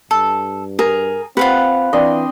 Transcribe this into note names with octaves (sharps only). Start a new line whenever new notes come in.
G2 A4
G#4 A#4
C4 F4 B4 F5 F#5
E3 C4 D4 D#5